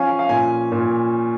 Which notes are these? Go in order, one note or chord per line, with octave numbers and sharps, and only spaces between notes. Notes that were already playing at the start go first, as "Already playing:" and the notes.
Already playing: F3 C#4 F5 G#5
F5
A#2 G#5
A#2